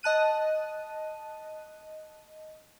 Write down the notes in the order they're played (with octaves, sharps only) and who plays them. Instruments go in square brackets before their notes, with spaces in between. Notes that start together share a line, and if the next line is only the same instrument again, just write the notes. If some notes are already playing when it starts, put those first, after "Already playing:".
[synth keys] D#5 A5 F#6 D#7